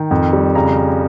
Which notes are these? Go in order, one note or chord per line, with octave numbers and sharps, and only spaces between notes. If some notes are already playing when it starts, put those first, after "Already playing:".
Already playing: D#3 G5
F2
G3
C#3 A#5